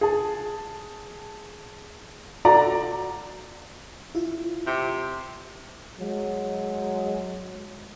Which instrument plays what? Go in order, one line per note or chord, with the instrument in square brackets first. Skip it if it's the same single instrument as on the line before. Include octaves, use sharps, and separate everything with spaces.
[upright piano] G#4 A5
F#4 A4 D5 A#5
[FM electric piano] E4 F4
[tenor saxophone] C3
[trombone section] F#3 G#3